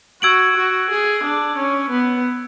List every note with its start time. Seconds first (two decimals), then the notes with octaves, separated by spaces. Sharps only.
0.22 F#4 E6 G#6 D7 F#7
0.56 F#4
0.90 G#4
1.24 D4
1.57 C#4
1.90 B3